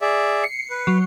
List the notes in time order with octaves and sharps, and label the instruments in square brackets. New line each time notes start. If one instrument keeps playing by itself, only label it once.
[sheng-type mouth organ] G#4 D5 E5
[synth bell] C7 C#7
[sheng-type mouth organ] B4
[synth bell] F#3